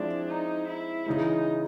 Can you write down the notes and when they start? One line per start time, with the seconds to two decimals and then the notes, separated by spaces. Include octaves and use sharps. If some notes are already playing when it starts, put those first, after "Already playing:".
Already playing: F3 G#3 C4 D4 E4
0.29 D#4
0.68 E4
1.06 C#3 E3 G#3 D#4